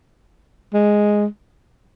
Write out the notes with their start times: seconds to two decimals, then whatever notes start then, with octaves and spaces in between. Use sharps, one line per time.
0.73 G#3